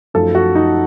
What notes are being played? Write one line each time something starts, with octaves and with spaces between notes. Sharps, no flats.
F#2 F3 A3 D#4 A4
F#4
D#4